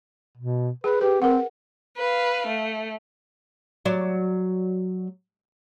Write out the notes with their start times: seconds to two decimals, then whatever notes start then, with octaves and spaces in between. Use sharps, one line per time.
0.37 B2
0.84 G#4 B4
1.01 G4 B4
1.22 C4 A#4 F#5
1.97 B4 F5
2.47 A3
3.85 F#3 D5